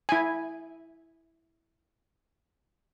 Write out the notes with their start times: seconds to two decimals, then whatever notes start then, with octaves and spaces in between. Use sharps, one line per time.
0.09 E4 G#5